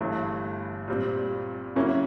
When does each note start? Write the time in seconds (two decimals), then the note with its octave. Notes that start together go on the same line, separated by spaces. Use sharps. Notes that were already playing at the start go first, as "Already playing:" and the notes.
0.01 G1 G2 E3 A3
0.88 A#2 G3 C4
1.76 C#3 F#3 A#3 C#4 E4